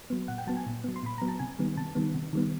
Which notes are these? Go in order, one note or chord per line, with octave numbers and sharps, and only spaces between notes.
F#3 B3
A#2 F#5
G5
F#3 B3 A5
G#5
A#2
F#3 B3
C6
A#2 B5
F#3 B3 A#5
A5
C3 G#5
D#3 G3 B3
C3 A5
D#3 G3 B3
C3
D#3 G3 B3